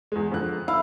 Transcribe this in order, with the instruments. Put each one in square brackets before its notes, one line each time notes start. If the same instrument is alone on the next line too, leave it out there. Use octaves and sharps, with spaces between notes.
[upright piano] E2 G#3
F2 D3 F#6
[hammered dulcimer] E4 [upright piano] F5